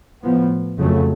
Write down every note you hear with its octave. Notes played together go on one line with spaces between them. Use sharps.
A2 F3 B3
F2 C#3 F#3 A3